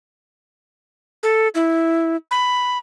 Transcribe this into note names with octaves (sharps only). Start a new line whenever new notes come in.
A4
E4
B5